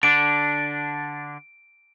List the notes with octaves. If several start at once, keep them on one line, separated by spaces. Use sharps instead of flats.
D3 D4 D7